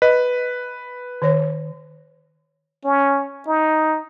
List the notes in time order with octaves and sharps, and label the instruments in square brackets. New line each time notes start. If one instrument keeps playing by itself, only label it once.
[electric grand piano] B4 [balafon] D#5
[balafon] D#3 C#5
[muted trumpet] C#4
D#4